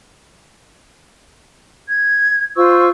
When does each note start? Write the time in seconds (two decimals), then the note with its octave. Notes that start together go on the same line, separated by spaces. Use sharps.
1.87 G#6
2.56 F4 C5 C#6 E6